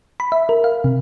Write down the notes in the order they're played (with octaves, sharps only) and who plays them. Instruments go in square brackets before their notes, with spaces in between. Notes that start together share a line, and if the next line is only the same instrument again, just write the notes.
[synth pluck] B5
E5
A#4
F5
C3